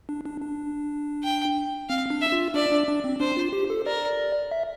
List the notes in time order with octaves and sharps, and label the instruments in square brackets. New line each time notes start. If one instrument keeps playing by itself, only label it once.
[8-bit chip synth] D4
D4
D4
[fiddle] G5
[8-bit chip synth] C4 [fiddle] F5
[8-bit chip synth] D4
[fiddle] E5
[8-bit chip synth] F4
[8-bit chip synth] D4 [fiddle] D5
[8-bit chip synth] D4
D4
C4
[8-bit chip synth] D4 [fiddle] C5
[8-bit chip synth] F4
G4
A4
[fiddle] A#4 [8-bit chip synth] D5
[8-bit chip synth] E5